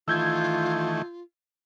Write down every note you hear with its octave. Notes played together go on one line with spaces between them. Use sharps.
D#3 E3 A3 F4 E6 G6 G#6